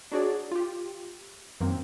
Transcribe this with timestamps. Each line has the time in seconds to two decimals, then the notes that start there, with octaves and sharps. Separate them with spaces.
0.12 D4 D#4 F#4 G#4 C#5 D5
0.51 F4 G4
1.60 F#2 D#3 F#3 A#3 C4